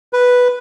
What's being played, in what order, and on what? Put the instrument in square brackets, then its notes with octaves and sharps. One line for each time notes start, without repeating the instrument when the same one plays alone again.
[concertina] B4